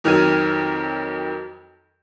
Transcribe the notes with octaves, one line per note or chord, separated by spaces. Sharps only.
F2 D#3 F#3 F6 G#6 D#7